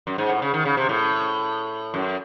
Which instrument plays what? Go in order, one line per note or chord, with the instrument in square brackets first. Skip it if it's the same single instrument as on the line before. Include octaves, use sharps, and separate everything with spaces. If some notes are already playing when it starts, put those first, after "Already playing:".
[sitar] F#2
G#2
A2
C#3
D#3
C#3
C3
A2
F#2